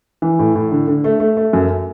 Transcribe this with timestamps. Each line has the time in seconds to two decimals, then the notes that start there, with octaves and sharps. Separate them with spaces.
0.22 E3
0.39 A2
0.55 A2
0.71 D3
0.88 D3
1.04 A3
1.20 A3
1.37 A3
1.53 F#2